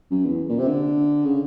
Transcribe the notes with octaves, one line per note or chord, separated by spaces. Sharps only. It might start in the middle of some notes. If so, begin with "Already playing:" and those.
F#2
E2
A#2
C3
D3
C#3